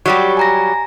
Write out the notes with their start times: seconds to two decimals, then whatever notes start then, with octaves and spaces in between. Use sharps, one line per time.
0.06 F#3 G3 G4 C#6
0.37 G#5 A#5 A#6